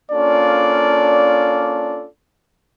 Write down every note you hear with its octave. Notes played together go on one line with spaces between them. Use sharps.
A#3 C#4 D4 F4 A4 D5